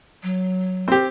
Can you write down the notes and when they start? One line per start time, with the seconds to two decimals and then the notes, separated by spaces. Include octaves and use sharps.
0.23 F#3
0.88 C4 G4